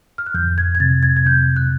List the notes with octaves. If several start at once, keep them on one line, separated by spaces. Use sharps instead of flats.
F6
F#6
F2 G6
G#6
G#6
C3 A6
G#6
G#6
C3 G6
F#6